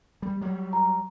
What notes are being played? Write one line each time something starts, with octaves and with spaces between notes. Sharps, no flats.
G3
F#3 G3
A#5